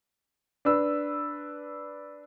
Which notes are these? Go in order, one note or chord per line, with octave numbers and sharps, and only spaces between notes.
D4 B4 E6